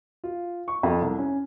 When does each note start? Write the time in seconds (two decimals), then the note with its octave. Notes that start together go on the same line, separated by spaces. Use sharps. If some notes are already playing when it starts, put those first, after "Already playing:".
0.24 F4
0.68 C#6
0.83 F2
1.01 C2
1.19 C#4